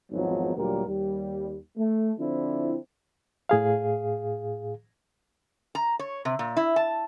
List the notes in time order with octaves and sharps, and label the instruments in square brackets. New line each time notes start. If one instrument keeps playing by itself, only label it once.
[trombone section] G#1 E2 F3 F#3 B3 D#4
D2 A#2 F#3 G3 G4 A#4
D#2 G3
A3
D3 F3 C4 D4 E4
[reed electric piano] A2 G#4 F5
[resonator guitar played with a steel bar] A#5
C#5
C3
A#2
E4
A5